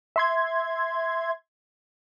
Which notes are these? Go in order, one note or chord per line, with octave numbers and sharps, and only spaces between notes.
E5 C6 G#6